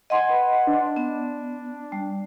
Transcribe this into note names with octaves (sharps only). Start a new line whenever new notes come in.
D#5 F#5 G#5 C6
B4
D4
B3
G3